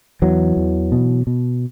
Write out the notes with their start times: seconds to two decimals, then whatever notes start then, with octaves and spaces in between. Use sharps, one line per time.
0.22 E2 E3 F#3
0.57 E2
0.92 B2
1.27 B2